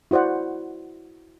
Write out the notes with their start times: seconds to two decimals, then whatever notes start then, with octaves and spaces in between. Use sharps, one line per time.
0.11 E4 F#4 C5 D5 F#5